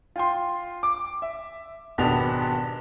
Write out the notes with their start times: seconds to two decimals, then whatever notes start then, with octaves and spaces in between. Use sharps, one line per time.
0.16 F4 G5 C6
0.83 D6
1.22 E5
1.98 G#1 B2 B3 D4 G4 F7